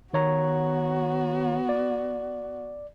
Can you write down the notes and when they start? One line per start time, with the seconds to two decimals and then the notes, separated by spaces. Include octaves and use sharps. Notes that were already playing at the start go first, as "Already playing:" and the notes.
0.14 D#3 B3 F#4 C#5 A#5
1.69 D5